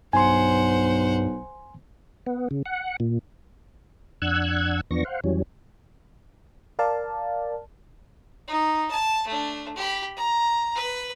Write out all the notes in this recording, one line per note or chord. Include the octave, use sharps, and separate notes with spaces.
B1 G2 C5 F#5 G#5 C6
B3
C#3
F#5
A#2
F2 D4 F#5 E6 F#6 G#6
E2 F3 B3 D4 C#6 A#6
C5 F5 F#5
F2 E3 F#3 G3 C#4
A#4 D5 F5 A5
D#4
A5
A3 D4
G4 B5
A#5
B4